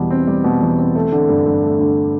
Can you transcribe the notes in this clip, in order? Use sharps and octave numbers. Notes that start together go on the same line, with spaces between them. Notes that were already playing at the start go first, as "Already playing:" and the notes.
Already playing: E2 B2 G3
C4
G3
B2
E2
C4
A3
D3
G2
G2
A3
D3